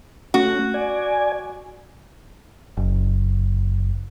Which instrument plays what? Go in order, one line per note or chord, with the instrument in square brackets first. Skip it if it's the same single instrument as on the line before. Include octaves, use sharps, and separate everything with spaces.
[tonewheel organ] A3 C#4 [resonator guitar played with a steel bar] F#4
[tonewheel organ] D5 G#5
[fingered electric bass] F#1